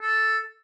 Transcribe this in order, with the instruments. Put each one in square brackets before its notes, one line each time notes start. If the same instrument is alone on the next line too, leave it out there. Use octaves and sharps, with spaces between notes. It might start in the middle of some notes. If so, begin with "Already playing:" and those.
[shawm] A4